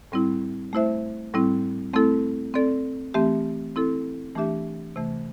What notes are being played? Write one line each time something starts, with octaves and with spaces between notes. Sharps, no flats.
A2 G3 C4 E4
A3 E4 C5 E5
A2 G3 C4 E4
A3 C4 E4 A4
C4 A4 D5
E3 A3 C4 G4 E5
C4 E4 A4
E3 A3 D4 G4 E5
C3 E3 A3